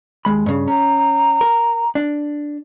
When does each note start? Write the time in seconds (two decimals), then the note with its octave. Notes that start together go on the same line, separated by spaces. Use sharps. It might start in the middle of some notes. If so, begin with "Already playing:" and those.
0.25 D#2 G#3 B5
0.46 G2 C#3
0.68 C#4 A#5
1.41 A#4
1.95 D4